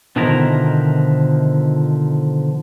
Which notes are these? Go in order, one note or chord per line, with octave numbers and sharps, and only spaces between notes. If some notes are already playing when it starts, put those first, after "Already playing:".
B2 D3 D#3 F3 E4 A#4